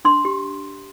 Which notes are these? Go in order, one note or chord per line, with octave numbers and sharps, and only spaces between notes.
D4 C6
G4